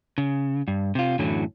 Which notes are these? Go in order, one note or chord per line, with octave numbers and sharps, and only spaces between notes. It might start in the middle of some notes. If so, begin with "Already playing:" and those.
C#3
G2
C3 F4
F#2 A2 D3 E3 F#3